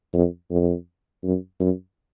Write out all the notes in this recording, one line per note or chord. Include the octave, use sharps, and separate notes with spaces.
F2
F2
F#2
F#2